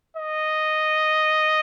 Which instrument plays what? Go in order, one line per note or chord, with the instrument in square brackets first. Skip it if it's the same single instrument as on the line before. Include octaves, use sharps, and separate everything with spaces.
[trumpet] D#5